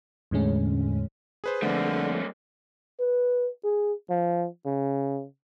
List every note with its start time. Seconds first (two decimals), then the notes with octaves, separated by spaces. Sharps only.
0.31 E2 A2 D3 G#3 C#4
1.44 G#4 B4 C5
1.62 F2 D3 G3 A3 A#3
3.00 B4
3.64 G#4
4.10 F3
4.65 C#3